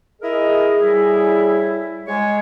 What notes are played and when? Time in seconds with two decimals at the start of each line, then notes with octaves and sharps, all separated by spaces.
0.21 E4 G#4 A#4 D#5
0.78 A2 G3 E4
2.07 G#3 C#5